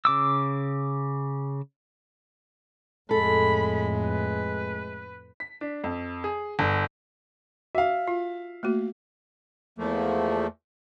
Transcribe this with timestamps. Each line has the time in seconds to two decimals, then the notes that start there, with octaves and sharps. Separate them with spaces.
0.05 C#3 D6 E6
3.11 F2 A2 G#3 A4 B5
4.05 B4
5.40 B6
5.61 D4
5.84 F2
6.24 G#4
6.59 G1
7.75 F#4 E5 F5
8.08 F4
8.63 A3 A#3 F#4
9.78 E2 F3 A3 A#3